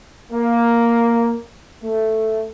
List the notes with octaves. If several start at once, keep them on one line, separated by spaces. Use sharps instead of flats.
A#3
A3